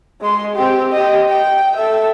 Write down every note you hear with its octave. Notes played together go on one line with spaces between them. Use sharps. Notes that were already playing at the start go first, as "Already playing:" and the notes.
G#3 C6
C4 G4
G4 D#5
G5
A4 E5